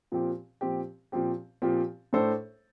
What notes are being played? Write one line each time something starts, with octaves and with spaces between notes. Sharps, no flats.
A#2 F3 C4 G4
A#2 F3 C4 G4
A#2 F3 C4 G4
A#2 F3 C4 G4
A2 A3 D4 A4 C5